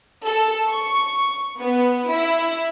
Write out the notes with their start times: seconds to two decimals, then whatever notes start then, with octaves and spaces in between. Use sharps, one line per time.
0.25 A4
0.69 C#6
1.60 B3
2.09 E4